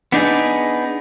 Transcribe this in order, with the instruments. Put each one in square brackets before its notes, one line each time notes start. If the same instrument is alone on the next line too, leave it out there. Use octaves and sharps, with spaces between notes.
[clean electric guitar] B3 D4 D#4 G#4